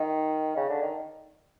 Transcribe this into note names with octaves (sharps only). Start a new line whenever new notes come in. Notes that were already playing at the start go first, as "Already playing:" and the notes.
Already playing: D#3
C#3
D3
D#3